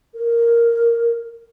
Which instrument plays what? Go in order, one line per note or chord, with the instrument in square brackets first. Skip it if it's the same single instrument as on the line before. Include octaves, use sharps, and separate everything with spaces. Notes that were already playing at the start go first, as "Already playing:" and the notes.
[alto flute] A#4